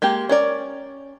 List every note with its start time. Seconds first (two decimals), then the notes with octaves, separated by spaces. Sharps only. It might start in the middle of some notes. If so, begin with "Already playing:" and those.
0.02 G#3 A#3 G4
0.29 C#4 A#4 D5